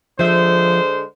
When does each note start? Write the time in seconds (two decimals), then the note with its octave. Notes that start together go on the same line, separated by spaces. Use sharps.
0.19 D3 F3 G#3 C5 E5